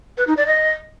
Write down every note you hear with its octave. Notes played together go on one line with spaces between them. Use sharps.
B4
D#4
D5
D#5